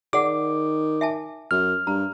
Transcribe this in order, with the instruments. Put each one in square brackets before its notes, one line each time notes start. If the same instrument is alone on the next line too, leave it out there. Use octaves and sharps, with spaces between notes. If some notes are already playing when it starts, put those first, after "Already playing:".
[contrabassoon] D#3 [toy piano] G#4 D5 F#5 [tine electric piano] D6
[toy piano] E5 G#5 A5
[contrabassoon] F#2 [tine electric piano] F6
[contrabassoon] G2 [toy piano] A#5